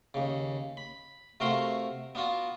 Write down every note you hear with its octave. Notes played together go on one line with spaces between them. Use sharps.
D#2 C#3
B5
C3 A3 F#4 A#4 F5 C6
B3 D4 F4 F#4